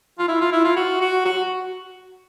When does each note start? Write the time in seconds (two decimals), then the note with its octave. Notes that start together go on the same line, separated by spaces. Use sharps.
0.19 F4
0.29 E4
0.41 F4
0.52 E4
0.64 F4
0.77 F#4
1.01 F#4
1.25 F#4